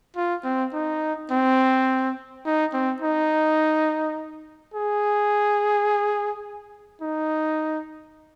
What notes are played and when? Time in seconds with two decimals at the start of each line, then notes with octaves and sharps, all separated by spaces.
0.16 F4
0.44 C4
0.73 D#4
1.31 C4
2.46 D#4
2.73 C4
3.02 D#4
4.74 G#4
7.02 D#4